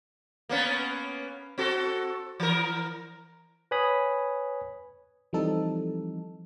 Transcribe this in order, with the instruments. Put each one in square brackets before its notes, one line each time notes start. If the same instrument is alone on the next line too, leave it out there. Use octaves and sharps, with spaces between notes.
[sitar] A#3 B3 C#4
C4 F#4 A4
E3 A#4
[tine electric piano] B4 C#5 G#5 B5 D#6
[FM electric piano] E3 F3 G3 C4 D#4 A4